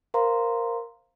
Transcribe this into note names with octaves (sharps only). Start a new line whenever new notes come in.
A#4 C5 F5 A#5 C6